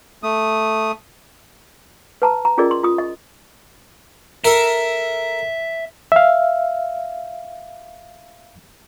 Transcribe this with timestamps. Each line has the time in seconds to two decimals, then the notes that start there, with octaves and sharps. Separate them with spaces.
0.23 A3 D#6
2.22 B4 A5 A#5
2.45 A#5
2.57 C#4 F4 G#4 A#4 D5 D#5
2.71 C6
2.83 F4 D#6
2.98 D#5
4.44 A4 A#4 E5
6.12 E5 F5